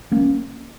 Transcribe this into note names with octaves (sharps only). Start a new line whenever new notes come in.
A#3 C#4